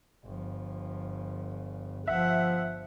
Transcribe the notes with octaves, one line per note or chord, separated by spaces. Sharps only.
G1 F3
G1 F3 E5 F#5